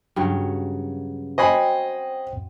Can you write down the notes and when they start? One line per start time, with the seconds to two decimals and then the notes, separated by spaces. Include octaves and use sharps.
0.16 G2 C#3 F#3
1.38 C4 F#4 C5 D#5 G5 G#5 B5 C7